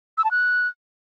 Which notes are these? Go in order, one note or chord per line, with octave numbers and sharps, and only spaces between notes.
E6
A5
F#6